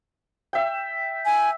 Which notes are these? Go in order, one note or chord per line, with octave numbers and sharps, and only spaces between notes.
E5 G5
G#5